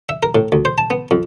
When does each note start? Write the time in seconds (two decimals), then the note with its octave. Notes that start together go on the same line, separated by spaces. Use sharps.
0.09 E5
0.23 A#4
0.35 A2
0.52 D2
0.65 C5
0.78 A5
0.90 B3
1.11 F2